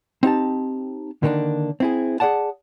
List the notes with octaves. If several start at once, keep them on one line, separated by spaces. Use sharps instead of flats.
C4 D#4 G4 A5
D3 D#3 A#3 C4 D4
C4 E4 G#4
G#4 A#4 D5 F#5 A5